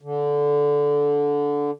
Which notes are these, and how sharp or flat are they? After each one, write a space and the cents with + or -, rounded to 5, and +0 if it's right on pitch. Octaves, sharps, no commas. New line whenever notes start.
D3 -15